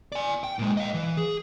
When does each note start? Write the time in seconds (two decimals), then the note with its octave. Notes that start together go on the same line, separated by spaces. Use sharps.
0.12 D5 G#5
0.44 G5
0.59 A#2 G#3
0.77 D#5 F5
0.94 E3
1.17 G#4